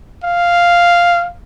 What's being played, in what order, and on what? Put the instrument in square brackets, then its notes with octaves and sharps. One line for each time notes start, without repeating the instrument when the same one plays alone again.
[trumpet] F5